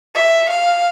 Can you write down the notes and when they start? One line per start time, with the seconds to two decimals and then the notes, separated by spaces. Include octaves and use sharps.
0.15 E5
0.50 F5